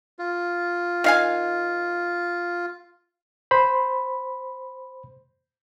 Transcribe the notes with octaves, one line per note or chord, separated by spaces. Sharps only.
F4
D#3 F5 G#5
C5 B5